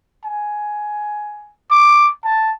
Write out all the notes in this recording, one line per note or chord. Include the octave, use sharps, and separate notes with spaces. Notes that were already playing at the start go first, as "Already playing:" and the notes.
G#5
D6
A5